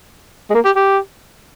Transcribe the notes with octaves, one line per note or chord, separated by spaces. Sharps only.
G#3
A#3
G4
G4